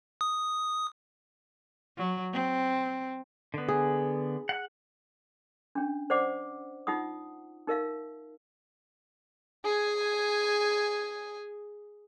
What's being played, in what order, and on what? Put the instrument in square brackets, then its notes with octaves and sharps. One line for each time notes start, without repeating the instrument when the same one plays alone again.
[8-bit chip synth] D#6
[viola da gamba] F#3
C4
[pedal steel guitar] D3 B3
[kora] G#4
[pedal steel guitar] F#5 F#6
[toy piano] C#4 D4
C5 D5 F#5 D6
D#4 F4 F#5 D#6
D#4 A#4 E5 F5
[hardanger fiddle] G#4 G#5